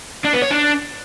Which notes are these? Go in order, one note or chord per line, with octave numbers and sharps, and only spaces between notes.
D4
B3
C#5
D4